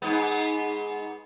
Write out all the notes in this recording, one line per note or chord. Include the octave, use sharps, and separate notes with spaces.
G#2 B3